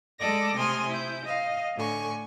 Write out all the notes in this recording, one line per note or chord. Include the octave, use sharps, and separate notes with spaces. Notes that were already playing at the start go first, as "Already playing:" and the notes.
G#3 A4 D5 D#5 D6 A#6
C3 A3 G#5 C6 D#6 F6
E4 G6
D#5 F5
A2 D3 G#5 C#6